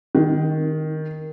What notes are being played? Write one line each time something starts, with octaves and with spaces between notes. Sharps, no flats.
D#3